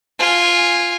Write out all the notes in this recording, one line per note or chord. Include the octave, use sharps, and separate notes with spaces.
F4 G#5